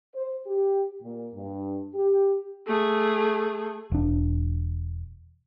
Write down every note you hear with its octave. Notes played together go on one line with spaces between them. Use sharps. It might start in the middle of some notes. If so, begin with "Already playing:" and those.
C5
G4
A#2
G2
G4
A3 G#4
E1 D4